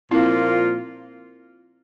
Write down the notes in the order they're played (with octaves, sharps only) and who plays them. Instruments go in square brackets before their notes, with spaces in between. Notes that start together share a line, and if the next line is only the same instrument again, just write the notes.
[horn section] A#2 F3 A#3 F4 [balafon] C4 E4